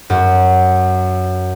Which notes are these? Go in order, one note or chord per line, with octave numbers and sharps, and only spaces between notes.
F#2